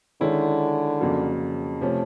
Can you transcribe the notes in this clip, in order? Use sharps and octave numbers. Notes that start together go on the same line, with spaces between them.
D3 D#3 G#3 C#4 E4
F2 C#3 F#3 A#3
C3 F3 A3 C#4